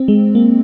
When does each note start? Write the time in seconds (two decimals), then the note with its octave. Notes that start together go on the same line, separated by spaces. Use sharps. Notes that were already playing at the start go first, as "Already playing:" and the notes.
Already playing: C4
0.08 G#3
0.35 A#3